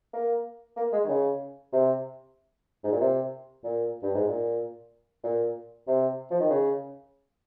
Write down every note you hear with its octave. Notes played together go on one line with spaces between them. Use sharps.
A#3
A#3
G#3
D#3
C#3
C3
G#2
A#2
C3
A#2
G2
G#2
A#2
A#2
C3
F3
D#3
C#3